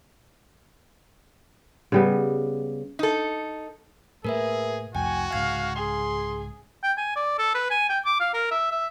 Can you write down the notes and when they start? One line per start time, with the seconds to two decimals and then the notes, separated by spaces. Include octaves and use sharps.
1.92 C#3 G3 B3
2.99 D#4 A4
4.25 A2 A3 A#3 G#4 A#4 B4 E5
4.95 C2 F2 A2 F#4 G5 G#5
5.33 C2 G#2 C#3 F5 G#6
5.76 G#4 C6
6.83 G5
6.97 G#5
7.16 D5
7.38 A4
7.54 B4
7.70 G#5
7.89 G5
8.05 D6
8.20 F5
8.34 A#4
8.51 E5
8.71 E5